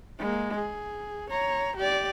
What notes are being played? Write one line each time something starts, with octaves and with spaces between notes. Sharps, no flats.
G#3 A#3
G#4
C#5 A#5
G4 D5